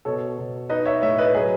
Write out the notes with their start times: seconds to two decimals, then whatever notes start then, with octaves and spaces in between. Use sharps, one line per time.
0.05 B2 A4 C#5
0.38 B2
0.69 D#4 B4 D#5
0.86 C#5 E5
1.02 A2 C#5 E5
1.18 B4 D#5
1.34 F#3 G#4 B4